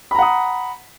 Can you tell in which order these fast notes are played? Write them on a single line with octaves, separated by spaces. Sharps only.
B5 A#5 F#5 D#6